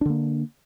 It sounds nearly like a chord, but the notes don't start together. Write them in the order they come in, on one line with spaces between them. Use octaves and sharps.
D4 D3 A#3